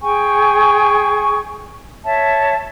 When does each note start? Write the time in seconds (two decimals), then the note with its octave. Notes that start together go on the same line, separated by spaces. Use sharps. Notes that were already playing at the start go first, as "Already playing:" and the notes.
0.01 G#4 G5 G#5 C#6
2.04 C#5 E5 A5